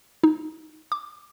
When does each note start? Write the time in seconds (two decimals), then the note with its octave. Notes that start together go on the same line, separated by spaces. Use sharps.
0.24 D#4
0.92 D6